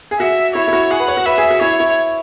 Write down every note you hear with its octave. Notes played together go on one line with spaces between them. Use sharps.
G#4
F#4 E5
E4 C#5
E4
F#4
G#4 F#5
B4
C#5
F#4
B4 E5
G#4
F#4
E4 C#5
E4